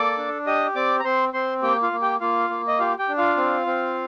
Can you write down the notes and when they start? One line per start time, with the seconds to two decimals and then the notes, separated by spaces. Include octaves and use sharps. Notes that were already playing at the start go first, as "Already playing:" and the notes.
Already playing: A#3 A4 D5 D6
0.18 D4
0.46 G4 D#5 D#6
0.76 C4 D5 D6
1.00 A#5
1.04 C4 C5 C6
1.34 C4 C5 C6
1.62 A#3 G4 G5
1.82 F4 F5
1.92 A#3
2.02 G4 G5
2.21 A#3 F4 F5
2.50 A#3
2.68 D#5
2.79 F4 G4 F5
2.99 G4 G5
3.09 D4
3.18 F4 F5
3.37 C4
3.67 C4